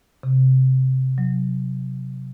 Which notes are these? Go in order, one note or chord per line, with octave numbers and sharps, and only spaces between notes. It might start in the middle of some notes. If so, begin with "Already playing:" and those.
C3
F#3